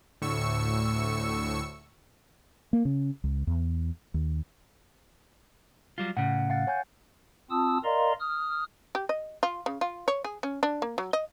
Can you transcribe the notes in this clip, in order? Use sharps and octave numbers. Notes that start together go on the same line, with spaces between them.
D2 A2 C#6 E6 C#7
A#3
C#3
C#2
E2
D#2
F#3 G3 F4
A2 C#3 F#5
F5 F#5 A6
C#5 G#5 G6
C4 F4 A5 D#6 E6
A#4 D5 D#5 F5 A#5 C6
D#6 F6
G4
D#5
F4
C#3
F4
C#5
G#4
C#4
D4
A#3
F#3
D#5